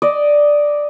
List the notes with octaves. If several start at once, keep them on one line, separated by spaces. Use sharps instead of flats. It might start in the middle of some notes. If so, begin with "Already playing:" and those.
D5 D#5